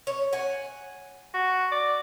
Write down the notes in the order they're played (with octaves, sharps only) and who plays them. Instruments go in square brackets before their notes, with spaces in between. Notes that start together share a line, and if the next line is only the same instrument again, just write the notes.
[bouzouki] C#5
F#5 G#5
[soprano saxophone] F#4
D5